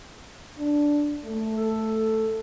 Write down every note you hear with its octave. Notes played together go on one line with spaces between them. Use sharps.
D4
A3
A4